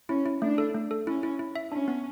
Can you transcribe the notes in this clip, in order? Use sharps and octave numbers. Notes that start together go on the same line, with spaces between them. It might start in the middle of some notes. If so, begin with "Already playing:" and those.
C#4 E4
E4
A3 D4
A4
A3
A4
C#4 E4
E4
E4
E5
C#4 D4
B3